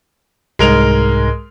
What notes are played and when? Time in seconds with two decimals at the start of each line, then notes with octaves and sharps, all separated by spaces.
0.59 C2 G#2 G#3 A#4 F7